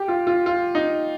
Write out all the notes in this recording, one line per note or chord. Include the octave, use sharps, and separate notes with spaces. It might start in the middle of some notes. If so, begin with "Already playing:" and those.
Already playing: G4
F4
F4
F4
D#4